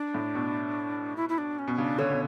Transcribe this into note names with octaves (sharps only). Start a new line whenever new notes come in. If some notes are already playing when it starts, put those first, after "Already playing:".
Already playing: D4
A2
B2
E4
E4
D4
C#4
B2
C#3 D4
D3 C#5
B2